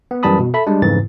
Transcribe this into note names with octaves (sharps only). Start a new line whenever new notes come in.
B3
F#2 E3 G3 A5 B5 D#6
B2
A4 E5 B5
G3 G#3 D4
F2 G#2 C#3 E3 A6